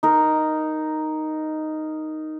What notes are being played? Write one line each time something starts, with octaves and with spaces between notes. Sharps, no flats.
D#4 A#4